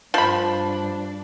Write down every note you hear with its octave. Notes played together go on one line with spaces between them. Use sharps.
G2 F3 D4 B5